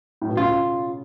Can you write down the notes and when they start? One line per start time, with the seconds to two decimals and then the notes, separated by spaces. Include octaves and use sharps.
0.22 A2
0.29 B2
0.37 C#3 F4